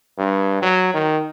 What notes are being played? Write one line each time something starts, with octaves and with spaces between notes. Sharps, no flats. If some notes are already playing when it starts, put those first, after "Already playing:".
G2
F#3
D#3